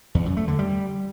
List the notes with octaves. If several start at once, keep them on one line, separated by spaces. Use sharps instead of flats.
E2
F#2
A3
D3
G3